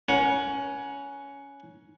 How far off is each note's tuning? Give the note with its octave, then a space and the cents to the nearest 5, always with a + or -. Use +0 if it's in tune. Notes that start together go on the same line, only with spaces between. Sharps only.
C#4 +15 A#4 +45 F#5 +0